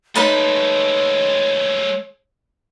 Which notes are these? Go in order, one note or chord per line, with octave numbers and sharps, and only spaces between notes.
G#3 A3 D#4 B4 C#5 A5